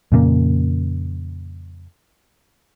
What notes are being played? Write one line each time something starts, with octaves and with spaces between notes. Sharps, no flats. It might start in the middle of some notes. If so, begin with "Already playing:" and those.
F2 A#2 C#3 A#3